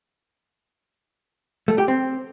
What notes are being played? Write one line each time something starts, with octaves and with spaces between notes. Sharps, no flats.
A3
G4
C4